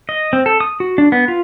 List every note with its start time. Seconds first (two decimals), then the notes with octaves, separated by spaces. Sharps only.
0.09 D#5
0.33 C4
0.46 A4
0.60 D#6
0.80 F#4
0.98 D4
1.12 B3
1.28 F4